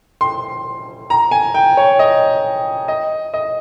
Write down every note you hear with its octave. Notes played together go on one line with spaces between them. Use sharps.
C6
A#5
G#5
G5
C#5
D#5
D#5
D#5